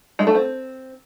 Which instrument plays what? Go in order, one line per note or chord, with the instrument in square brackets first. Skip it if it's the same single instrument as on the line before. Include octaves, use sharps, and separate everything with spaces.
[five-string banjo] G#3
A3
C4